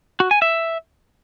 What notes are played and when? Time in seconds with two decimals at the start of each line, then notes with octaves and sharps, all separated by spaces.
0.20 F#4
0.31 G#5
0.42 E5